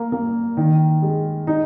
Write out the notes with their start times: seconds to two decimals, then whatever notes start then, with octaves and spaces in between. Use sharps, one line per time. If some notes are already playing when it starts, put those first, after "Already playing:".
Already playing: A#3
0.12 A#3
0.57 D#3
1.02 G#3
1.47 D#4